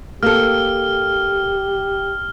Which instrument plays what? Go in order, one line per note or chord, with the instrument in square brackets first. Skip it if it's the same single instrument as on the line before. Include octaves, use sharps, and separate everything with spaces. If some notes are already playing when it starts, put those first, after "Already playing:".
[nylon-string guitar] A#3 A4 [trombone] G4 [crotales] F6